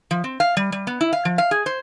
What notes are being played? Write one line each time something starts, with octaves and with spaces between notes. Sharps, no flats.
F3
C4
F5
G3
G3
B3
E4
F5
F3
F5
G#4
C5